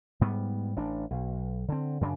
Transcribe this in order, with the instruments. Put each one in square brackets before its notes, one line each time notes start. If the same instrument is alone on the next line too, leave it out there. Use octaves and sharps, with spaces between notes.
[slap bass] G#2 G3 B3
A1 D4
B1
D3 C4
F#2 C#3 D4